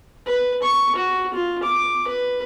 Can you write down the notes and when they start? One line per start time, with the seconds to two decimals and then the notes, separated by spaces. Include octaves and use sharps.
0.26 B4
0.62 C#6
0.95 F#4
1.34 F4
1.63 D6
2.07 B4